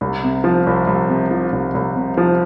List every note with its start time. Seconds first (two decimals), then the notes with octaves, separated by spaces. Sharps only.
0.01 C2
0.24 C3
0.44 F3
0.67 C2
0.87 C2
1.09 C3
1.31 F3
1.52 C2
1.74 C2
1.96 C3
2.17 F3